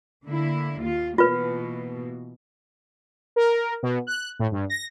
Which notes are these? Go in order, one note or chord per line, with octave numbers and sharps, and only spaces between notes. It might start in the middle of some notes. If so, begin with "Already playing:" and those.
D3 A#3 E4
D#2 F4
B2 E3 A#3 F4 B4
A#4
B2
F#6
A2
G2
A#6